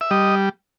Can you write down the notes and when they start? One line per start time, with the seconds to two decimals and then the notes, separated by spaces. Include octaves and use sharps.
0.01 E5
0.11 G3 D#5